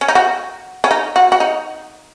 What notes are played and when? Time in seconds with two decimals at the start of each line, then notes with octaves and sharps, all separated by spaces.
0.01 C#4
0.08 D#4
0.15 F#4
0.84 C#4
0.91 D#4
1.16 F#4
1.32 F#4
1.40 D#4